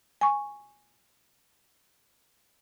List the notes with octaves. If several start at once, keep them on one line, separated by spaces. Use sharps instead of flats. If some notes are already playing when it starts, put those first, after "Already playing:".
G#5 C#6